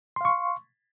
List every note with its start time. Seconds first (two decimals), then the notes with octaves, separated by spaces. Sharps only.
0.16 C6
0.21 F5
0.25 C#6